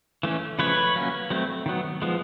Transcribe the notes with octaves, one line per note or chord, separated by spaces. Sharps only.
E3 A3 C#4
C#3 F3 A3 B4 C#5
F#3 A#3 C#4
F#3 A3 C4
D#3 F#3 B3
F3 G#3 B3